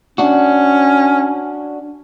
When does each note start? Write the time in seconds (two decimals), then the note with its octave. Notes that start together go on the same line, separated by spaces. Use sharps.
0.18 C#4 D4 F#4